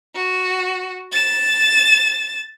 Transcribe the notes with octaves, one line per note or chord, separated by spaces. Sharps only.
F#4
A6 E7